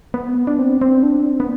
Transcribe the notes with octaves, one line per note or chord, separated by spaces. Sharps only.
B3
D4
C4
C4
D4
C4
B3